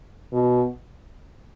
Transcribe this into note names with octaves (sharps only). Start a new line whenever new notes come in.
B2